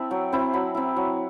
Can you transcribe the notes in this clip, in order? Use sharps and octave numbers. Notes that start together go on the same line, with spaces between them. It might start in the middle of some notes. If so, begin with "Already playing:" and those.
Already playing: C4 E4 E5 A5
F#3 G5
C4 E4 B5
F#3 B5
C4 E4
F#3